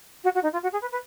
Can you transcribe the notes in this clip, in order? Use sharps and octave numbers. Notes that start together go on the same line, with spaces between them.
F#4
F#4
D#4
F4
F#4
G#4
B4
B4